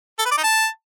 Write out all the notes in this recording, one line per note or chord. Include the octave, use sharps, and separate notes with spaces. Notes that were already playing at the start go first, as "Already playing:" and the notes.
A4
B4
D5
D#4
A5